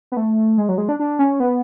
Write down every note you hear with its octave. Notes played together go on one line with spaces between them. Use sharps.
B3
A3
G#3
F#3
G#3
D4
D4
C#4
B3